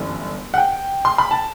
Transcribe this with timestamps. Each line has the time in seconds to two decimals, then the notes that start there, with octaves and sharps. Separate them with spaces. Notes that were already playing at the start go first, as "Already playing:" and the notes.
Already playing: G1 F#2 E3 A3
0.54 F#5
0.58 G5
1.05 C6
1.18 B5
1.31 A5